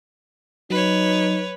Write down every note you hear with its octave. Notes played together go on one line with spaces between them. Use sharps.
F#3 D#4 B4 C#5